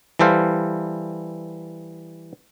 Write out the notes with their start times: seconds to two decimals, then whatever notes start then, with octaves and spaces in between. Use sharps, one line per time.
0.19 E3 G3 A4 C5 F5